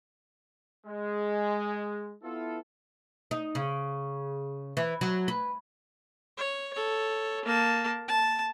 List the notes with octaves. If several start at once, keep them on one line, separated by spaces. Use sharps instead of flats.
G#3
B3 E4 F4 A4
D#4
C#3
E3
F#3
B4
C#5
A4 C#5
A#3 A5
A5